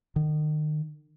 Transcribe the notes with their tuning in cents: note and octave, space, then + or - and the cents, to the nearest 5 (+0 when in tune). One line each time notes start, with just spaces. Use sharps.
D#3 -35